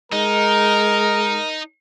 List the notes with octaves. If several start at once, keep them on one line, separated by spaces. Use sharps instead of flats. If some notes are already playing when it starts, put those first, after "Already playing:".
G#3 D#4 A#4